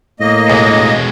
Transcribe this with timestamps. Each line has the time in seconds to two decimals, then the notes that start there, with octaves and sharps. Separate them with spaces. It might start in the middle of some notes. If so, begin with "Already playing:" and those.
0.20 A2 A#3 D#5
0.50 C#2 B2 G#3